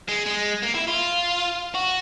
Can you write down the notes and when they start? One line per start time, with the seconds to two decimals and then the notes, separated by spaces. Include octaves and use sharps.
0.09 G#3
0.26 G#3
0.63 A#3
0.75 E4
0.88 F4
1.75 F#4